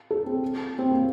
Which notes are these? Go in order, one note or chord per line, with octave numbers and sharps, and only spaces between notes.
A4
C4
C4
A#3